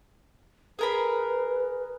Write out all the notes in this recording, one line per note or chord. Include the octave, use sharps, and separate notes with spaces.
G#4 A#4 B4 B5